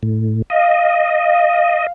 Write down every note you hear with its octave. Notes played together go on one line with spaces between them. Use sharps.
A2
D#5 F5